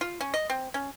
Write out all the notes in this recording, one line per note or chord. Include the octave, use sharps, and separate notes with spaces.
F4
C#4
D#5
C4
C#4